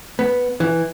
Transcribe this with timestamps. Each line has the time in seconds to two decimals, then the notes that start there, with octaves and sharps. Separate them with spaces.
0.19 B3
0.60 E3